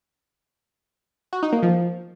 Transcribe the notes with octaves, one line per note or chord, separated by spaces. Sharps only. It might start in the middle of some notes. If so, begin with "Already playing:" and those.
F#4
D#4
A#3
F3